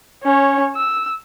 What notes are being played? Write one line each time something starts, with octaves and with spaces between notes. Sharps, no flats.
C#4 C#5
E6